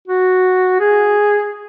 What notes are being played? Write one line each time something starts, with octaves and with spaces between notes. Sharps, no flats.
F#4
G#4